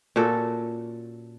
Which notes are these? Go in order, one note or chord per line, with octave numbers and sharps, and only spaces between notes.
A#2 C#4 F#4 A4